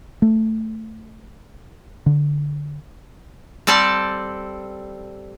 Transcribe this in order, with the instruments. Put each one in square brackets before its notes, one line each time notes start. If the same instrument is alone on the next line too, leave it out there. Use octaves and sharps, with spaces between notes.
[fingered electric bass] A3
D3
[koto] G3 C4 A4 D5 A5